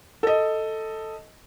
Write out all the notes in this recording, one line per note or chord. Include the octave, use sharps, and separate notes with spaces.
A4 D#5